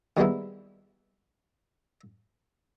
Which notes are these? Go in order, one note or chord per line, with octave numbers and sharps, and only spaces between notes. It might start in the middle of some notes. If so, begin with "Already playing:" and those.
D#3 G3 G#3 A#3 B3 E4